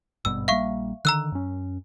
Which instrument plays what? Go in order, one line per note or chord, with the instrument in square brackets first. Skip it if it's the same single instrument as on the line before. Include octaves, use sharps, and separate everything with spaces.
[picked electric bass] G#1 G2 B2 [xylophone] E6
[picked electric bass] A#1 G3 A#3 [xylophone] E5 F5 C#6
[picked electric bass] D3 D#3 [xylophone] A#5 E6 F#6
[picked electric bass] F#2 C#4